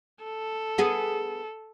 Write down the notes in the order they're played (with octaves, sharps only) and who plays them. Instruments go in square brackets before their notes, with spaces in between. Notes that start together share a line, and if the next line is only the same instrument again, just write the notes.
[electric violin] A4
[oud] B3 G#4